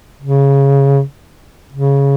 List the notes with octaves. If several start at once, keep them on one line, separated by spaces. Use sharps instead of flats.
C#3
C#3